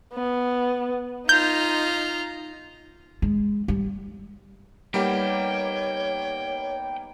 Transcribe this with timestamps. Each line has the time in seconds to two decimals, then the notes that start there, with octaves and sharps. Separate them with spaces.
0.13 B3
1.29 D#4 F4 A#5 G6
3.22 G#3
3.68 G3
4.94 G3 A#3 B3 D#4 G4 C#5 G5